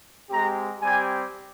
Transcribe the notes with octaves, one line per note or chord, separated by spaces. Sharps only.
G#3 C4 G4 A#5
G3 C4 G4 G#5